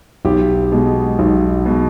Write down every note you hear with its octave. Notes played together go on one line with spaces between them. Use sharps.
B1 G4
B2 G#3
B1
B2 G#3